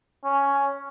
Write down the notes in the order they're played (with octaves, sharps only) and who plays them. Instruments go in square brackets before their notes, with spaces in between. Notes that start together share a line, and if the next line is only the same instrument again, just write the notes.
[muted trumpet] C#4